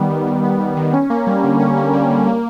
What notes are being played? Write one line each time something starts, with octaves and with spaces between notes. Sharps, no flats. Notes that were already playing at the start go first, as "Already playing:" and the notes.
Already playing: D#3 G3 B3
D#3
D#3
B3
G3
D#3
C#4
A#3
G3
D3
C#4
A#3
G3
D3
A#3